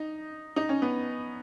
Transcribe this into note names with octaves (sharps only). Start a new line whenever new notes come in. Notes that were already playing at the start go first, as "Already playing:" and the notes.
Already playing: D#4
D#4
C#4
B3